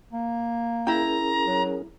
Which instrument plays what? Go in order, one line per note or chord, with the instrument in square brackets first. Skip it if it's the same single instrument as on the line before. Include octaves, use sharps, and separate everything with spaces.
[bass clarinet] A#3
[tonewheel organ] C#4 G#4 A#4 [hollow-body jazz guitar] E4 G5 [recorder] A#5
[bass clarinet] F#3